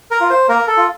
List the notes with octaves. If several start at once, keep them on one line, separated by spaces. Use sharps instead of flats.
A#4
F4
C5
A#3 A#4
A4
F4